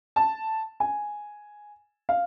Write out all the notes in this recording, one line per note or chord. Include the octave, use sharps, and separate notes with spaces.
A5
G#5
F5